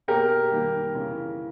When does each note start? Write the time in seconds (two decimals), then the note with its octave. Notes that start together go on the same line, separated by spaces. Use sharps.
0.08 B2 A#3 G4 A#4
0.51 D#3 G3 A#3
0.94 C#3 E3 A#3